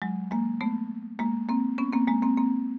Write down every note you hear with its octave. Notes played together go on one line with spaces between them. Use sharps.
F#3 G#3
G#3 A#3
A3 B3
G#3 A#3
A#3 C4
B3 C#4
A#3 C4
G#3 A#3
A#3 C4
A#3 C4